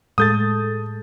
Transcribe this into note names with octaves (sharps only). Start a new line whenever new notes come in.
A2 G#3 A4 D#6 G6 A6